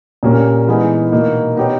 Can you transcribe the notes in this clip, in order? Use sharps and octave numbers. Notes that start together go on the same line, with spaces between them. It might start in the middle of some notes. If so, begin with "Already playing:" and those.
A#2 G3 A#3 C#4
E3 G#3 B3 D#4 G#4
B2 A#3 D#4
B3 D#4 G4 C#5